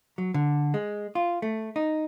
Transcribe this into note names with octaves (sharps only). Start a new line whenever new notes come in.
F#3
D3
G#3
F4
A3
D#4